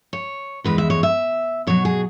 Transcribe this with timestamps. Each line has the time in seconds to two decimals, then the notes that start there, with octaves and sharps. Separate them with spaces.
0.13 C#5
0.64 E2 E3 G#3 B4
0.78 E5
0.90 C#5
1.03 E5
1.67 B2 F#3 C#5
1.85 G#4